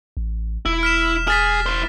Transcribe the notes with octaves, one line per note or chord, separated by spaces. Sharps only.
A1
E1 E4
F6 B6 E7
G#4 F6 A6 B6
E4 C5